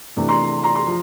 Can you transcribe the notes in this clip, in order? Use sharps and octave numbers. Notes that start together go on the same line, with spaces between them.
C3 E3 A3 D4
A#5 C6
A#5 C6
A#5 C6
F3